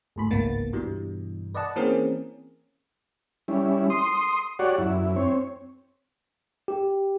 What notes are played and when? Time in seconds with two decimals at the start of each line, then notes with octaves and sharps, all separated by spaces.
0.16 G1 A2 B5
0.30 G1 C#2 G#2 A#3 B3 A6
0.73 G2 B2 E3 G3
1.54 B4 D5 D#5 F#5 A5
1.76 E3 A#3 C4 C#4 G#4 A#4
3.48 G3 C#4 E4
3.90 C6 D#6
4.59 F#4 G4 C#5 D5 F#5
4.78 F#2 E4
5.16 C4 C#5
6.68 G4